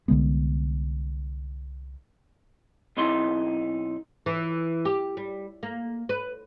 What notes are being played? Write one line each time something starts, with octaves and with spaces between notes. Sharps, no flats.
C2 D3 G#3 B3
B1 C4 D#4 E4 C6
E3
G4
G3
A#3
B4